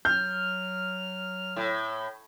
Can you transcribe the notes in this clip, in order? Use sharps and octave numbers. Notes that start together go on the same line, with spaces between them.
F#3 F6 G6
A2